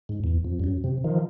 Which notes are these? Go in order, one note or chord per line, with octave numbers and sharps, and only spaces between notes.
G#2
E2
F2
G2
F#2
C3
D#3 F3